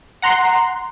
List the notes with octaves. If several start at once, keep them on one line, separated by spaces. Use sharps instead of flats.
F#5 A#5 C6